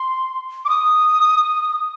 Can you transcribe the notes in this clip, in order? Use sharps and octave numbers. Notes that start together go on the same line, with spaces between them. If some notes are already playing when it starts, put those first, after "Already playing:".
Already playing: C6
D6
D#6